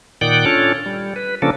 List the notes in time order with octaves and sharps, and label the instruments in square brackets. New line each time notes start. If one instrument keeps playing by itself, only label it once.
[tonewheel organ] A#2 D#3 D5 F#5 G5
C#4 D4 F4 A4 C#5
G3
B4
C#3 F3 A#3 C#4 D4 A4